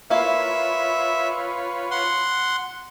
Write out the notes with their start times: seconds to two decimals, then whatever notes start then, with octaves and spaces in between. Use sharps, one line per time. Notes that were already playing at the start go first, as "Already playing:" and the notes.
0.10 A#3 E4 F4 B4 C#5 E5 F5
1.91 F#5 C6